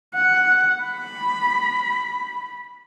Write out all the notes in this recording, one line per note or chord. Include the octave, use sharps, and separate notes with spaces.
F#5
B5